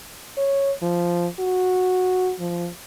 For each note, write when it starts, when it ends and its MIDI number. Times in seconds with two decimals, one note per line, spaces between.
0.37 0.72 73
0.82 1.27 53
1.40 2.33 66
2.40 2.69 53